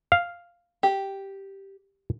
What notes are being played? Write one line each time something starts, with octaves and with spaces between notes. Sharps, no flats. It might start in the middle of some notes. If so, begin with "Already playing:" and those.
F5
G4